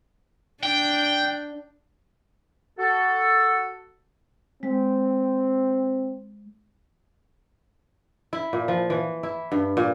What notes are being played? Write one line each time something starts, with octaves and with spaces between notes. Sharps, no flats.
D4 G5
F#4 A4
G#3 C4
E4
A#2
F3
E3
E4
G2
A#2